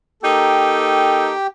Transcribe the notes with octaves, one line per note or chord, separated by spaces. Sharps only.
A#3 D#4 G4 A4 G5